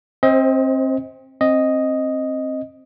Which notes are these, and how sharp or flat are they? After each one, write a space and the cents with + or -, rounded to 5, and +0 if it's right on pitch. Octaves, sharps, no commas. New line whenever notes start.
C4 +30 C5 +0 D#5 +30
C4 +20 D#5 +0